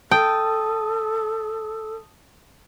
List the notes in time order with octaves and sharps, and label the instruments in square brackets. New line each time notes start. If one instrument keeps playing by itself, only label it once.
[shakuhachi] A4 [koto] G5 [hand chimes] A5 D#6